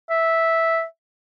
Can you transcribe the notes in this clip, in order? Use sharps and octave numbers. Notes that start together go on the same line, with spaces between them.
E5